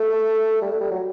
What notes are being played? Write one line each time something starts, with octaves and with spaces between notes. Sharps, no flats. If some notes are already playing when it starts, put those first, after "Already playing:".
Already playing: A3
G3
A3
G3
F#3